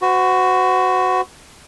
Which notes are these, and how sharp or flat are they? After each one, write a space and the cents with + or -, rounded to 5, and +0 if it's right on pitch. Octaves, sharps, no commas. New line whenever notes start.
F#4 +0 C5 -45